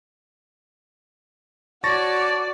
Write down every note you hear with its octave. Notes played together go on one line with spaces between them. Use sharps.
F#4 C#5 D5 A5 C#6 A6 A#6